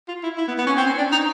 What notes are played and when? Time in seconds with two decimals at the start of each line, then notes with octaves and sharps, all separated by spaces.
0.08 F4
0.23 E4
0.38 E4
0.48 B3
0.58 B3
0.67 C#4
0.78 C4
0.87 C#4
0.98 D4
1.12 D#4